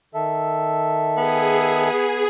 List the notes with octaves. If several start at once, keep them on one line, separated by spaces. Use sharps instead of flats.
D#3 A4 E5
B3 G#4